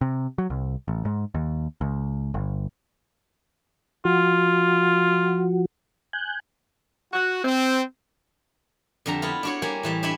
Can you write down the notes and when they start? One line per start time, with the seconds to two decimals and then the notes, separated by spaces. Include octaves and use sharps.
0.01 C3
0.38 F#3
0.50 C2
0.88 A1
1.05 G#2
1.34 D#2
1.81 C#2
2.34 G1
4.05 F3 F4 F#4
6.13 G#5 F#6 G6
7.13 F#4
7.44 C4
9.06 F2 D3 G3 A#5
9.22 B3 E4 F4
9.43 D4 F#4 C#5
9.62 G3 A#3 C5 C#5 G#5
9.83 A2 E3 G3
10.03 D4 C5 C#5 E5 G#5 B5